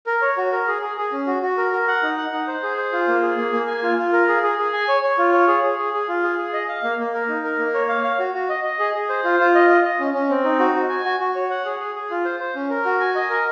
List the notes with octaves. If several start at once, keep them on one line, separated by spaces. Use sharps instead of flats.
A#4
C#5
F#4
A#4
G#4
G#4
G#4
C#4
F#4
F#4
A#4
A#4
F#5
D#4
F#5
D#4
C5
G#4
C5
F4
A#3
G#4
A#3
A#3
G#5
F4
F4
A#4
G#4
G#4
G#4
G#5
C#5
C#5
F4
C#5
G#4
G#4
G#4
G#4
F4
G#4
G#4
D#5
F5
A#3
A#3
A#4
D#4
A#4
A#3
C#5
F5
F5
F#4
F#4
D#5
D#5
G#4
G#4
C5
F4
F4
D#5
D#5
D#5
C#4
C#4
C4
D#4
F#4
F#4
G#5
F#4
F#4
C#5
F#5
G#4
G#4
G#4
F4
C5
C5
C#4
A#4
F#4
G#5
D#5
A#4